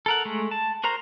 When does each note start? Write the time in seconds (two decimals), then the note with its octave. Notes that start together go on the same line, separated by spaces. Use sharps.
0.06 A4 A#4 F#5
0.25 G#3 A3
0.51 A5
0.84 F#4 A#4 C5 A#5